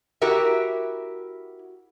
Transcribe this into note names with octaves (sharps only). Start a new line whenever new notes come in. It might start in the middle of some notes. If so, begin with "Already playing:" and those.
E4 F#4 G4 A#4 E5